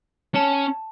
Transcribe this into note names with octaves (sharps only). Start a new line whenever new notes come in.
C#4 A5